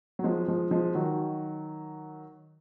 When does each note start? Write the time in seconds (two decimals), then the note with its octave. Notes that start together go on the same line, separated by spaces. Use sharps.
0.19 F#3
0.24 F3 G#3
0.48 F3 G#3
0.71 F3 G#3
0.95 D#3 F#3